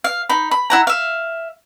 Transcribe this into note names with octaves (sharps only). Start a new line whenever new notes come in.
F5
D#4 B5
B5
E4 F#5 A#5
E5 F5